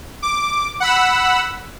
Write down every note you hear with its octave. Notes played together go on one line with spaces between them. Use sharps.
D6
F#5 B5 E6